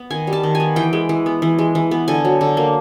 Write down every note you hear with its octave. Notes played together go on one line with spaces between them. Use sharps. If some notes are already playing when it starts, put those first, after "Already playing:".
Already playing: B3
D#3 G#5
G3
A5
D#3
G#5
B3
E3 G5
G#3
E3
B3
E3
G#3
E3
B3
D3 G#5
F#3
D3
A#3